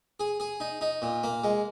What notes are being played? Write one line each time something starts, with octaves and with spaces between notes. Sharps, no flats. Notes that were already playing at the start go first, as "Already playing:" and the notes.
G#4
G#4
D#4
D#4
A#2
A#3
G#3